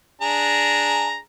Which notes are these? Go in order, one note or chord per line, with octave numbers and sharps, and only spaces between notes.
D4 G#4 A#5